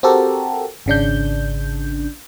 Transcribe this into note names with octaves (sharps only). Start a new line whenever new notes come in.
C4 F#4 G4 A4 A#4
G#1 C#3 D4 G6